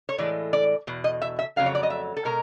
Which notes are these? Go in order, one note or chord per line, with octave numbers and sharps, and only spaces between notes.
C#5
A2 E3 G#3 D5
D5
E2 B2
D#5
E5
E5
F2 C#3 F#3 A3 F5
C#5
D5
D#5
E5
A4
B2 G#3 A#4